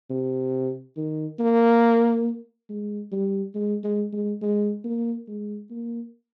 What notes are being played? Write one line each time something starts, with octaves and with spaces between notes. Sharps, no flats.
C3
D#3
A#3
G#3
G3
G#3
G#3
G#3
G#3
A#3
G#3
A#3